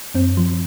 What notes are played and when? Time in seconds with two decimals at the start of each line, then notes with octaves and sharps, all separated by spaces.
0.14 F#2 C4
0.37 F3